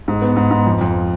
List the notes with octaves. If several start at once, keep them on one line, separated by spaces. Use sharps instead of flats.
G#2
B3
G#2
G#2
F2
F2